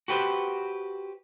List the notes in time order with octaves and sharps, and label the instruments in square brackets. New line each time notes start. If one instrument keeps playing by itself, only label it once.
[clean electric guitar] F#4 G4 B4 C5